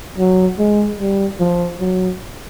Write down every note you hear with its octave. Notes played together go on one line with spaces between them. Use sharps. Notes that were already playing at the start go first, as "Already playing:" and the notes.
F#3
G#3
G3
F3
F#3